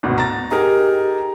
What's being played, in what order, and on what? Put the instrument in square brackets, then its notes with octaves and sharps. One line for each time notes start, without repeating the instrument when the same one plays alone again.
[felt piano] G#1 D2 B2
A#5 A6
[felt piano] D#4 G#4 A#4 [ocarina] G4